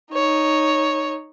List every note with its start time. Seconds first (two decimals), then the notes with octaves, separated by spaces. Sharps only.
0.13 D#4 C#5